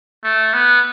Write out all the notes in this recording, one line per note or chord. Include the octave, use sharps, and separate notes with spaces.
A3
B3